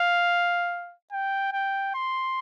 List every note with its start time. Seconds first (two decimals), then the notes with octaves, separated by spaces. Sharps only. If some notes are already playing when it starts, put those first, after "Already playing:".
Already playing: F5
1.12 G5
1.53 G5
1.95 C6